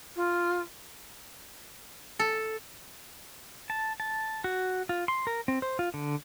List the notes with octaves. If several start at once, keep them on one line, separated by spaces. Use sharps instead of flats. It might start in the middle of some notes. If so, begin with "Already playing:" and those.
F4
A4
A5
A5
F#4
F4
C6
A#4
C4
C5
F4
D3